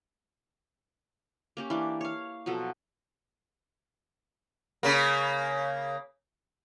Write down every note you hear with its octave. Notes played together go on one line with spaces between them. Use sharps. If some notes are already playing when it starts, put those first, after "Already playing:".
A#3 C#4 G4
E3 A#3 D4 D5
C#5 F5
B2 F3 F#3 A4
C#3 A#3